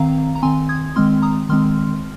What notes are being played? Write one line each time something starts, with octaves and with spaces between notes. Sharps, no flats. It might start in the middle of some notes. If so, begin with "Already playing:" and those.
Already playing: D#3 C4 F5 A#5
A#5
D#3 C4 G#5 C6
D#6 G#6
D#3 G#3 C4 C6 F6
A#5 D#6
D#3 G#3 C4 C6 F6